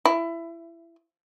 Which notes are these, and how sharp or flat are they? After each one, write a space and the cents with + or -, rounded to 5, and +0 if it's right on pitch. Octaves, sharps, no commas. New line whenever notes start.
E4 +20